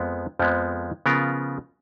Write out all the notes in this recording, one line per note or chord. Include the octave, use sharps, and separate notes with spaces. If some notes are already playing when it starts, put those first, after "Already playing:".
Already playing: F2 F3 G#3 B3
F2 F3 G#3 B3
C#3 F3 B3 F4 A#4